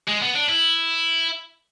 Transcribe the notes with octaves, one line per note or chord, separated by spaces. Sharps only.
G#3
B3
D4
E4